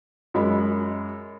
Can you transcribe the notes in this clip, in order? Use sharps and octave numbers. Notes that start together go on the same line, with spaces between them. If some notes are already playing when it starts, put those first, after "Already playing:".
F#2 G#3 B5